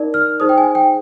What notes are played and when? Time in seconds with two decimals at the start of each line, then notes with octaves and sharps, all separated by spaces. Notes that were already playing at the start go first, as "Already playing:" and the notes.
Already playing: D#4 A#4 D5
0.14 F6
0.40 D#4 G#4 C5 D#6
0.49 G5
0.58 G#5
0.75 G5